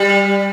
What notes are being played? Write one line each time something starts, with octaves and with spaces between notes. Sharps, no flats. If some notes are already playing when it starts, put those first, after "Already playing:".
Already playing: G3